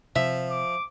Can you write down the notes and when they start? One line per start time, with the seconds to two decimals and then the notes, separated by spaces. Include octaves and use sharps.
0.16 C3 F3 E5
0.51 D6